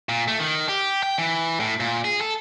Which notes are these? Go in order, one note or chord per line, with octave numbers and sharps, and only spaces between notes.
A#2
A3
D#3
G4
G5
E3
A2
A#2
G#4
A4